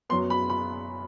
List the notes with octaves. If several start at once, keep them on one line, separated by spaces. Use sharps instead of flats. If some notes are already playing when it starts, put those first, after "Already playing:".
F#2 F#3 B3 C6
B5
B5